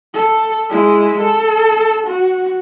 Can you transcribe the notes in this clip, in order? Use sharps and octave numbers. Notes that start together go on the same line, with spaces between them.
A4
G#3 E4
A4
F#4